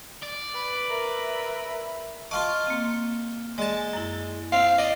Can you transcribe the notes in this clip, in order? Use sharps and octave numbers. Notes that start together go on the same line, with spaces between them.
D5
B4
A#4 E5
F4 D#5 F5 A5 C#6 D6
A#3 C4
G#3 D5 A5
F#2 E4
C4 F5
D5 D#5